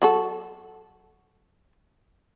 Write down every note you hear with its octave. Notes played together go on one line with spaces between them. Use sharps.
F#3 F#4 A4